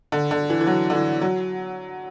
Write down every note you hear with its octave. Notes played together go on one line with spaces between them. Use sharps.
D3
D3
E3
E3
F#3
D3
E3
F#3